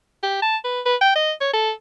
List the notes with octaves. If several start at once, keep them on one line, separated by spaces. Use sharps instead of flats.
G4
A5
B4
B4
G5
D#5
C#5
A4